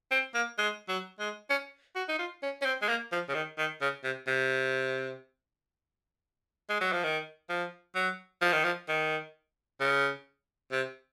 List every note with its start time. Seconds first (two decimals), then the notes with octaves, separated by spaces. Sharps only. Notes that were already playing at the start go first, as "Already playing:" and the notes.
0.12 C4
0.35 A#3
0.59 G#3
0.89 F#3
1.20 G#3
1.50 C#4
1.96 F#4
2.09 D#4
2.19 F4
2.43 C#4
2.62 C#4
2.66 C4
2.82 G#3
2.89 A#3
3.12 F3
3.29 C#3
3.35 D#3
3.58 D#3
3.81 C#3
4.04 C3
4.28 C3
6.70 G#3
6.81 F#3
6.92 F3
7.04 D#3
7.50 F3
7.95 F#3
8.42 F3
8.53 D#3
8.64 F3
8.89 D#3
9.81 C#3
10.72 C3